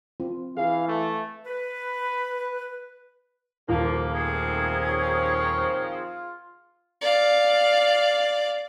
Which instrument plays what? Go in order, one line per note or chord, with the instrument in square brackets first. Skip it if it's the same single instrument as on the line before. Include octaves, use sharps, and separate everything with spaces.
[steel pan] C4 F4
[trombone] E3 [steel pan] G#4 B4 [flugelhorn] F5
[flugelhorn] A3
[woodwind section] B4
[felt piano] D#1 [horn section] F3 A#3
[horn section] D#3 F3 C4 [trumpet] A3 [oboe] G#4
[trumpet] C#5
F4
[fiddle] D5 F5